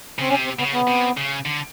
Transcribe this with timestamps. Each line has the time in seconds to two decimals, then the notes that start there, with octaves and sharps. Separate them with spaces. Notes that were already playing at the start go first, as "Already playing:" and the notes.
0.19 C#3 C4
0.30 C3 C#4
0.45 C4
0.59 C#3 B3
0.73 B3
0.87 C3
1.17 C#3
1.45 D3